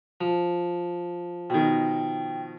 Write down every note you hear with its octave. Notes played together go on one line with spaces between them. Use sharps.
F3
B2 D#3 G5